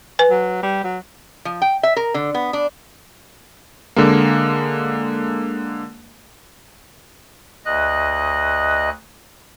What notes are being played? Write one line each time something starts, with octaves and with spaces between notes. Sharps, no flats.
B4 G#5
F#3
G3
F#3
F3
G5
E5
A#4
D3
B3
D4
D3 G#3 A#3
D2 D#5 F#6